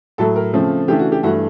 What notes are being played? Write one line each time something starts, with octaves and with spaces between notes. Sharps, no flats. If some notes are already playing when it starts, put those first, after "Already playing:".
A2 F#3 A3 A4
A#4
C#3 F3 A3 C4
C#3 E3 A3 D4 G4
F#4
G4
G2 E3 A3 F#4